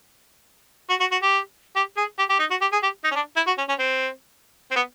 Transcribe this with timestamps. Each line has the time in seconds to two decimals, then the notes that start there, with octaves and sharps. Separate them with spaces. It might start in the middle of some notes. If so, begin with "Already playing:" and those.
0.89 F#4
1.00 F#4
1.11 F#4
1.22 G4
1.75 G4
1.97 G#4
2.19 G4
2.29 G4
2.39 D#4
2.50 F#4
2.61 G4
2.72 G#4
2.83 G4
3.04 D#4
3.11 C#4
3.15 D4
3.36 E4
3.47 F#4
3.58 C#4
3.68 C#4
3.79 C4
4.71 C4
4.76 B3